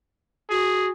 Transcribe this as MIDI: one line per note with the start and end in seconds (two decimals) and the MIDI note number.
0.50 0.90 66
0.50 0.89 68